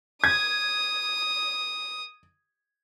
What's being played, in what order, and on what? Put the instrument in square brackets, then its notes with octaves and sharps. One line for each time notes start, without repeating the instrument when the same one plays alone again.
[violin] D#6 [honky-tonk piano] G#6